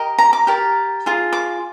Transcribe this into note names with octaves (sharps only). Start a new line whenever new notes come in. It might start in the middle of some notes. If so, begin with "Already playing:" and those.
Already playing: G4 A#4 D#5
A#5
D6
G4 A#4 D5
F4 G#4
D6